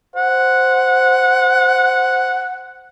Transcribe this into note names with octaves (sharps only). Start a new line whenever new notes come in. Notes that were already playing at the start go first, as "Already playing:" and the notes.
C5 F#5